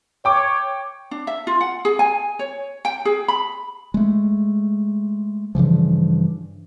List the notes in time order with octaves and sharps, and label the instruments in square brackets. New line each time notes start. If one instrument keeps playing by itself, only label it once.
[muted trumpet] C#5 [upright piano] G5 D6
[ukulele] D4
E5
F4
F#5
G#4
G#5
C#5
G5
G#4
B5
[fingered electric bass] G#3 A3
G2 C#3 E3 F3